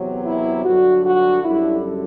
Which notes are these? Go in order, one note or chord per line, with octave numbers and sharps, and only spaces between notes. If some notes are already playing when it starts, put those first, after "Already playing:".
Already playing: E2 C3 F#3
E4
G2 D3 F#3 F#4
F#4
F#2 D3 G3 E4